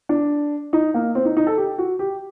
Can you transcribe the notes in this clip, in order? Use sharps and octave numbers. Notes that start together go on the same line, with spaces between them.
D4
D#4
A#3
C4
D#4
D#4
A4
G4
F#4
G4